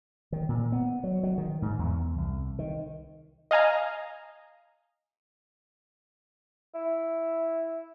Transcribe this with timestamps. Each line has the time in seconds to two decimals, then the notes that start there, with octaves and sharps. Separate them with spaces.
0.32 D#3
0.49 A#2
0.72 B3
1.04 F#3
1.23 F#3
1.38 D#3
1.62 G#2
1.79 E2
2.18 C2
2.59 D#3
3.51 D#5 F5 G#5 A#5
6.75 E4